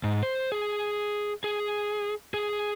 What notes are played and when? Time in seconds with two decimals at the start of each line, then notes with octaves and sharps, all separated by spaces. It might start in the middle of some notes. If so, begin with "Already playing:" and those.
0.03 G#2
0.23 C5
0.52 G#4
1.44 G#4
2.34 G#4